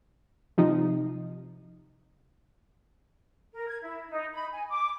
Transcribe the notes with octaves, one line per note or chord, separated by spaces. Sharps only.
C3 F3 D#4
A#4
G#6
E4
D#4
B5
G#5
D6